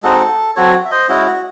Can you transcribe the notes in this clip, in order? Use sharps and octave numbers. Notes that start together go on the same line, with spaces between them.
G#3 C4 D#4 F#4 A4
F#3 C4 F#4 A4 C#5
E5
C5 D#5
G#3 C#4 E4 F#4
F#4